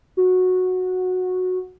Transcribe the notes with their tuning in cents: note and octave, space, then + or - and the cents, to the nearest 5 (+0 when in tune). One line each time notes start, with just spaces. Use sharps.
F#4 -10